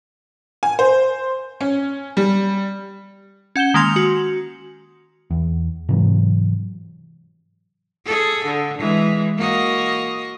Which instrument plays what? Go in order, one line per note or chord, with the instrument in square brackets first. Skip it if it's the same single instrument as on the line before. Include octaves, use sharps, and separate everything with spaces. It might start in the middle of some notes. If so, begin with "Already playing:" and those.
[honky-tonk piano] G#5
C5
C#4
G3
[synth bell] C#4 F#5 G6 E7 G7
D#3 G#3 A#3 G#5 C6 F7
F#4
[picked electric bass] E2
G#2 C3 E3 F#3
[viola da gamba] G#4 A4
D3
E3 G#3
A#3 F#4 D#5